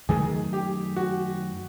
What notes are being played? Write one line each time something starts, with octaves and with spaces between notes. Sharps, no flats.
F#2 D#3 F#3 A3 G#4
G4
F#4